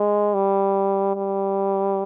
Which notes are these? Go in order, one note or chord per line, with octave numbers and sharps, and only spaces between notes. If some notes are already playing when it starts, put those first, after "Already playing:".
Already playing: G#3
G3
G3